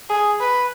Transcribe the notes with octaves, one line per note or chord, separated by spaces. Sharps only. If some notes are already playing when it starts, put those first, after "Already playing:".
G#4
B4